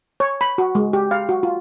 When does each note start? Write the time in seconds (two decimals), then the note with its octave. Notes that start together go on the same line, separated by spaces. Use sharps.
0.20 C#5
0.41 B5
0.58 F#4
0.75 G#3
0.93 G4
1.11 F5
1.29 F#4
1.43 F4